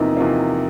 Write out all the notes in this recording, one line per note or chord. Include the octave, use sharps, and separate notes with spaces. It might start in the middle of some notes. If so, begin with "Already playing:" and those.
Already playing: E2 C3 F3 A#3 D#4
E2 C3 F3 A#3